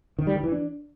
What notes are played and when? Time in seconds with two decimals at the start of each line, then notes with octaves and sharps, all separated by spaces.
0.19 D#3
0.27 G3
0.35 D#3
0.44 E3
0.52 D4